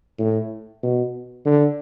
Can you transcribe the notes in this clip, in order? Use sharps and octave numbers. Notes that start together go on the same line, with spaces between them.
A2
B2
D3